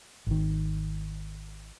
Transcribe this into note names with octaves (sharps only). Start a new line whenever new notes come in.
G#1 D#3